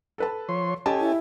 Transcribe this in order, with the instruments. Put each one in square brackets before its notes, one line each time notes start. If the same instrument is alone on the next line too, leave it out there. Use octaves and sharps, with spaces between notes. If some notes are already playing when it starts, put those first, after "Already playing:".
[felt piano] A4 B4 A5
[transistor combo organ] F3 C#5 C6
[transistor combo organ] C#4 A4 G#5 [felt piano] G4 D#5 A5
[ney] E4